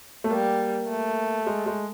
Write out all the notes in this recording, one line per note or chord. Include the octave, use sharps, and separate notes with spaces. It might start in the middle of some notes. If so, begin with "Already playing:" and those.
A3
G3 A#3
A3
G#3
G#3